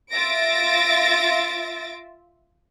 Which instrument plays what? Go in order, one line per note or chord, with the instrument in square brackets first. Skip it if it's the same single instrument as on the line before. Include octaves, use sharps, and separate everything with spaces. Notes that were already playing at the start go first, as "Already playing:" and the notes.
[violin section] F4 E5 A6 A#6 D7